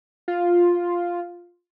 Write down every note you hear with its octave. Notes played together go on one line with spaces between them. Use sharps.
F4